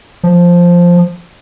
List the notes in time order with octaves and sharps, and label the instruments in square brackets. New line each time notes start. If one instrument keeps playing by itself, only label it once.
[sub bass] F3